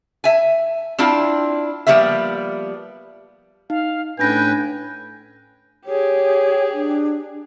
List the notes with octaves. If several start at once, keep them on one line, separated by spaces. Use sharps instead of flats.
E5 G#5
C4 D4 E4 F4
F3 G3 A#3 B3 E5
D#4 F5
A2 C#4 D4 B4 G5 G#5 A#6
G4 G#4 C#5
D4